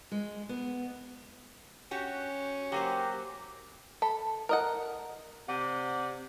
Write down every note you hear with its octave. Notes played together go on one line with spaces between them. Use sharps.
G#3
B3
C#4 F#4 G4
F#3 A#3 G4 C5
A4 B5
A#4 D#5 F#5
C3 D5 F#5